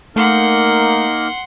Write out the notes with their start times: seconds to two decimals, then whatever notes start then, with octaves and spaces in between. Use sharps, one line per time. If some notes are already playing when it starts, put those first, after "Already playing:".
0.16 A3 A#3 D#4 A#4 F#5 C6